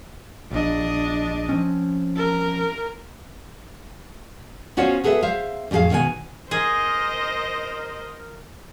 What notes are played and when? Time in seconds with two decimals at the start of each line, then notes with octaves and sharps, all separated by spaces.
0.51 A#1 D4 D#5
1.49 F3 C4 C#4
2.16 A#4
4.77 B3 C#4 F4 F#4 C5 C#5
5.04 B3 G#4 A4 B4 E5
5.22 C5 E5 F5
5.71 F2 A2 G4 G#4 F5
5.91 B2 D#3 B3 B4 G#5
6.51 G#4 A#4 C5 D#5